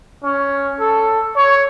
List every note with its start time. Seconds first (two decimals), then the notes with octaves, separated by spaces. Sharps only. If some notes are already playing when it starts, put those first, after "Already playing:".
0.24 C#4
0.80 A4
1.36 C#5